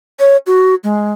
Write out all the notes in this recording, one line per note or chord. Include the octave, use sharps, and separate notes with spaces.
C#5
F#4
G#3